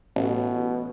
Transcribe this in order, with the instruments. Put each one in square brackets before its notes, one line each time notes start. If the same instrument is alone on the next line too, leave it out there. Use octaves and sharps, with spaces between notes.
[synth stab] A1 [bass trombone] B2